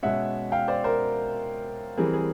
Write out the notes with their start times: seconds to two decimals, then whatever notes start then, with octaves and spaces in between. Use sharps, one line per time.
0.03 B2 G#3 C#4 E5 F#5
0.52 F5 G5
0.68 C5 D5
0.84 A#4 C5
1.97 E3 G3 C4 G#4 A#4
2.13 G#4